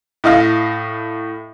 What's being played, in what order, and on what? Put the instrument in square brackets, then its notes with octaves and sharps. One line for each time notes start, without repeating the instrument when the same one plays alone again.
[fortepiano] A2 D#5 F5